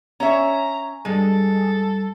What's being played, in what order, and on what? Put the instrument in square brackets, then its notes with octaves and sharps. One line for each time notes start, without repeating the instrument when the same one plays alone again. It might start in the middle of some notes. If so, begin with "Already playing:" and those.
[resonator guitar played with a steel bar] C#4 C#5 E5 [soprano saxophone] A#5
[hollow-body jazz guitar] G2 [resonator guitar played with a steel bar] G#3 [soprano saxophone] A4